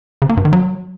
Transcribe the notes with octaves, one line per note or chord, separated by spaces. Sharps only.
C#3
A#3
G2
D#3
F#3